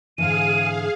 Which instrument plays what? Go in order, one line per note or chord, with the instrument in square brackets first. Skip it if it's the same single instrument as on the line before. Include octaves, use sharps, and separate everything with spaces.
[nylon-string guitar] G#2 D3 E3 [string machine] G#4 F5 [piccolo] D#7